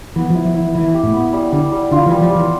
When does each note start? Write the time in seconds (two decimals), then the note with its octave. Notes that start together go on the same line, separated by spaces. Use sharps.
0.16 E3 B3
0.30 F3
0.35 E4
0.45 F3
0.55 E4
0.60 E3
0.75 E3 E4
0.94 G4
1.03 A2
1.14 B3
1.33 G3
1.52 D3 G3
1.72 G3
1.91 D3 F4
2.06 E3
2.11 G3
2.21 F3
2.30 G3
2.36 E3